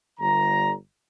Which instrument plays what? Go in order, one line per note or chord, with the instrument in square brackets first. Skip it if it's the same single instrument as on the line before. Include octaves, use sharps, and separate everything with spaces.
[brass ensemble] G1 D3 A#5